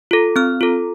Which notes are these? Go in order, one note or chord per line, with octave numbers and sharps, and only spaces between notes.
F4 A4
C4 F6
F4 A4